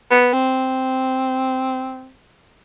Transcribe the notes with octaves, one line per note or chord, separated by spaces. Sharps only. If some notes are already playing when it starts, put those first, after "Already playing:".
B3
C4